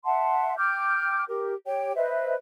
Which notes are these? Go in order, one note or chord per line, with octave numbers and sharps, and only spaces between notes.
E5 F#5 A5 C6
G5 D6 F6 G6
G4 A#4
G4 C#5 G5
B4 C5 D#5 E5